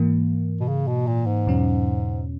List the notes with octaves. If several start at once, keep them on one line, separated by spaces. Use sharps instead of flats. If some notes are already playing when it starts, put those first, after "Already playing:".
Already playing: G#2 E3 A#3
B2
C#3
B2
A#2
G#2
E2 B2 F#3 C#4